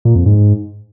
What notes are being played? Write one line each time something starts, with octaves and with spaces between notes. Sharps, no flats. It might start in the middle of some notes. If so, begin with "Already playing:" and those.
A#2
F2
G#2